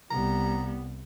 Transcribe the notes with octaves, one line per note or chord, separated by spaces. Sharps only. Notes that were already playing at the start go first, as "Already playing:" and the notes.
C2 G3 B3 A#5